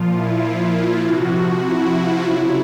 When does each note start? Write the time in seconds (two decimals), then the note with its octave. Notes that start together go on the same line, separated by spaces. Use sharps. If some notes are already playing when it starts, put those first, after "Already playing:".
Already playing: A#2 F3 F4
0.11 E4
0.42 F4
1.02 C3 F3 F#4
1.62 E4
1.92 F4
2.23 C#3 F#3 E4